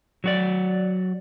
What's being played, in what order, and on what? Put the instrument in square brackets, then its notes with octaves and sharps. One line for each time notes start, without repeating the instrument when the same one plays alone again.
[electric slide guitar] F#3 F#4 D5